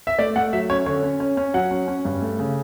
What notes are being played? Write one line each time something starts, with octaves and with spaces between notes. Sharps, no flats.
E5
A3 D5
A3 F#5
F#3 E5
C#4 C#5
D3 C#5
C#4
C#4
C#4
F#3 F#5
C#4
C#4
G2
A3
C#3